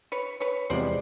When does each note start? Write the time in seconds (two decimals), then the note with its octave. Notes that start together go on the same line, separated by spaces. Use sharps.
0.12 B4 C#5
0.40 B4 C#5
0.70 E2 C3 F3 G#3 C4 C5 D5